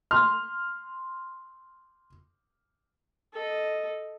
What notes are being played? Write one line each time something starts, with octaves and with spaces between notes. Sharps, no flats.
C6 F6
A4 D#5